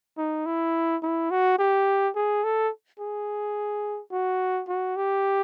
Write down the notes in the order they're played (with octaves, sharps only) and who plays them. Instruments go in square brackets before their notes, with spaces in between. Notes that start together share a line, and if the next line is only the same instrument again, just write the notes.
[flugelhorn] D#4
E4
E4
F#4
G4
G#4
A4
G#4
F#4
F#4
G4